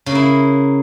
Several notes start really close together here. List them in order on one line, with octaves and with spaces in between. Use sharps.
C#3 A#3 E4